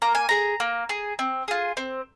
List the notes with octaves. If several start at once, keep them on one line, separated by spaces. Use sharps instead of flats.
A#3 A#5
G#5
G#4 A#5
A#3
G#4
C4
F4 G#4
C4